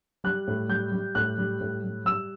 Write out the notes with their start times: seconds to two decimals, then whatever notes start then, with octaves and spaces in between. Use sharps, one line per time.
0.24 G3 F#6
0.48 A2
0.69 G3 G6
0.92 G3
1.15 A2 F#6
1.38 G3
1.61 A2
1.83 G3
2.05 G3 E6